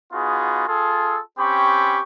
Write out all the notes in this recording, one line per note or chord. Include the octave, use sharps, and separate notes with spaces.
B3 D#4 F4 F#4 G#4
F4 G#4 A4
C4 C#4 G4 B5 C#6